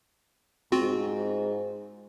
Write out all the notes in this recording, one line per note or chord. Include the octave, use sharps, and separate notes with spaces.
G#2 C4 F4 F#4